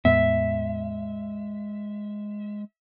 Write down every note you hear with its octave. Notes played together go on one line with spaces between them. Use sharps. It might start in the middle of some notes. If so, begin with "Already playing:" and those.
E2 A2 G#3 B3 E5